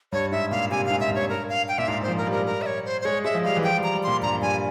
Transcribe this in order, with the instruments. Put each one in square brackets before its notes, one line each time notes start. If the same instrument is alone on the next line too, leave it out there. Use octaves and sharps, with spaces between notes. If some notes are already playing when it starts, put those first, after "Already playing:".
[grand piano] G2 [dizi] C#5
[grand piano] G#2 [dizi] E5
[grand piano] A#2 [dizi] F5
[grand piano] C3 [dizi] G#5
[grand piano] G#2 [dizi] F5
[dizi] E5
[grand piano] G2
[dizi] C#5
A#4
F5
G5
[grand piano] A#2 [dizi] E5
[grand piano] G#2 [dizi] F5
[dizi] C5
[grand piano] F3
[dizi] A#4
[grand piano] G3
[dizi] A#4
A#4
E5
C#5
C5
C5
[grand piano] G#3 [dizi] C#5
[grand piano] G#3 [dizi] E5
[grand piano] F3
[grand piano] G3 [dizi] F5
[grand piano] E3
[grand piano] F3 [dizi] G5
[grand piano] G3
[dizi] A#5
[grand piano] G3
[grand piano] A#2 [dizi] C6
[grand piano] G2 [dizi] A#5
[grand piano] G2 [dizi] G#5